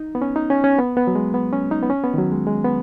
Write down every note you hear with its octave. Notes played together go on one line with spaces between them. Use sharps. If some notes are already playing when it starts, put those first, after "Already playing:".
Already playing: D#4
B3
C#4
D#4
C#4
C#4
B3
B3
F#3
G#3
B3
C#4
D#4
B3
C#4
B3
D#3
F#3
G#3
G#3
B3